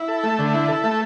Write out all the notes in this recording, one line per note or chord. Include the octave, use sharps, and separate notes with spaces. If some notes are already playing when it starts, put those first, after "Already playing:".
Already playing: E4
A4
A3
D3
E4
A4
A3